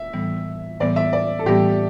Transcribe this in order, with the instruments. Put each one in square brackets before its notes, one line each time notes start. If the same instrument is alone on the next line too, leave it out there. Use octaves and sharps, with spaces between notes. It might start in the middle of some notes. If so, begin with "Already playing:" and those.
Already playing: [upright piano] E5
[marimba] A2 E3 G3 B3
[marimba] A2 E3 G3 B3 [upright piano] D5
[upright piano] E5
D5
A4
[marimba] A2 E3 G3 B3 [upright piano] G4